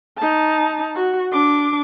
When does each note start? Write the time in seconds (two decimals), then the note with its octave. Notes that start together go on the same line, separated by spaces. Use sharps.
0.18 D#4 A5
0.95 F#4
1.32 D4 D6